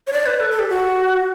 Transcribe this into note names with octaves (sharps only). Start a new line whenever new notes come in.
C#5
D5
B4
A4
A4
G4
F#4